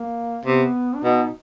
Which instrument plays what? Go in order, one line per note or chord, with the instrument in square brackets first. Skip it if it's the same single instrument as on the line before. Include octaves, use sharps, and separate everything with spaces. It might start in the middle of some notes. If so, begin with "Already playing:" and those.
Already playing: [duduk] A#3
[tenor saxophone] C3 [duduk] B3
[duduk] D4
[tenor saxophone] B2 [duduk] D#4